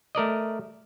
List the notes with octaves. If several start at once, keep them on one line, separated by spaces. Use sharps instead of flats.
A3 A#4 D5 D#5